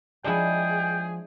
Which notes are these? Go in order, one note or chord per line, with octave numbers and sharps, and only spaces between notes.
F3 G#3 D4 E4 G#4 D5 G5